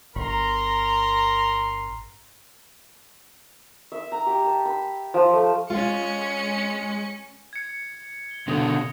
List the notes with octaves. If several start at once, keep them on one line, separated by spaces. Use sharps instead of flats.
G1 A#4 A#5 C6
E5
A#5
G4
A5
B5
F3
A3
G#3 C#4 F4 C#7
G#6 C#7
G7
B2 D3 D#6 A#6